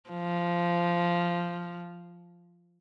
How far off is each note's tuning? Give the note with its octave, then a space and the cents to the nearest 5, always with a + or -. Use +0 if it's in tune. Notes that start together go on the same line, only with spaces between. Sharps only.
F3 -10